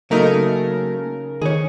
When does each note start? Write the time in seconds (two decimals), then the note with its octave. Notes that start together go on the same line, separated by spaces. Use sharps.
0.11 C#3 F#3 A3 A#3 D#4 A#4
1.42 D#3 G#4 C#5